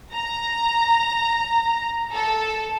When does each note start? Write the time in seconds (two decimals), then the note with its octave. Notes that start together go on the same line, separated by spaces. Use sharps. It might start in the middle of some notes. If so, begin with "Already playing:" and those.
0.13 A#5
2.12 A4